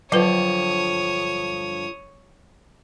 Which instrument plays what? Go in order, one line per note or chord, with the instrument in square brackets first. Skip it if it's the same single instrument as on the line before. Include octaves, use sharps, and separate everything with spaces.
[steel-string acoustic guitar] G2 D3 F3 [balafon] F#3 B4 [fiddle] C#5 D#6